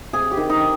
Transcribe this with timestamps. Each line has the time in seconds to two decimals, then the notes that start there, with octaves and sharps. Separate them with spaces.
0.13 C3 G#4
0.31 G4
0.37 D#3
0.50 D#4